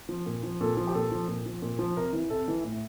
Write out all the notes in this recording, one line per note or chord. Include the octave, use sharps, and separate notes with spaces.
F3
A#2
F3
A#2 A4
F3
G4
A#2 A4
F3
A#2
F3
A#2
F3
C3 A#4
E3
C3 A4
E3
A2